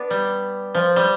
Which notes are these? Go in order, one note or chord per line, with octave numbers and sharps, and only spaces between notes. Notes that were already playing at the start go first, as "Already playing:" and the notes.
Already playing: B3 D4
G3
F3
G3